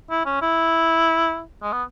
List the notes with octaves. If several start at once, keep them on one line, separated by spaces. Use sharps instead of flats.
E4
C#4
E4
G#3
B3